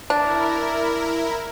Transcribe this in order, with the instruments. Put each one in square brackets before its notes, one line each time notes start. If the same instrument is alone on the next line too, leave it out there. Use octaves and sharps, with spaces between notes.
[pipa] D4 [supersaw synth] E4 A#4